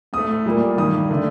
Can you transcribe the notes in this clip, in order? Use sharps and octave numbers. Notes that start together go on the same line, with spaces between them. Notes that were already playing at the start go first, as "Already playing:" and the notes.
A2 A3 D#6
A#2 G3 A#3
G2 D#3 A#3 D#6
D3 A3